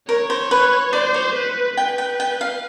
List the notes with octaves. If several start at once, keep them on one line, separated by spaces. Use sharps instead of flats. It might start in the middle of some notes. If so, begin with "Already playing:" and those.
A#4 C#5
C5
B4
C5 D5
C#5
B4
B4 G5
G5
G5
F5